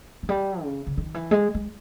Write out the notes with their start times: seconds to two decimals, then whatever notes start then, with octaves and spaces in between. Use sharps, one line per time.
0.23 E3
0.29 G3
0.63 C#3
0.87 C#3
0.97 D#3
1.14 E3
1.31 G#3
1.55 G#3